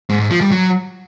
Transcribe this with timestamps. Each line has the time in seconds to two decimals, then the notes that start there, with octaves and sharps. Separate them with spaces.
0.09 G#2
0.20 G#2
0.30 F3
0.41 G3
0.51 F#3